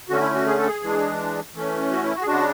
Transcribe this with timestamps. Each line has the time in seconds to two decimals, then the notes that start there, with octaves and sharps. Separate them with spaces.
0.09 D3 A3 C#4 F#4
0.21 E4
0.34 F#4
0.46 G#4
0.57 A4
0.67 G#4
0.83 E3 G#3 D4
1.54 E3 A3 C#4
1.92 F#4
2.04 E4
2.15 F#4
2.22 G#4
2.27 C#3 G#3 D4 F#4